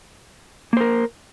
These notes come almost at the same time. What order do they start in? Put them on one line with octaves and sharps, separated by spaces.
A#3 C5 A#4